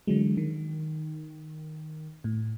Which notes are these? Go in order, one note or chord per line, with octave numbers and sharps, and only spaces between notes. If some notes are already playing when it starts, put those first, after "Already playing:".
D3 E3 F#3 G#3
D#3
A2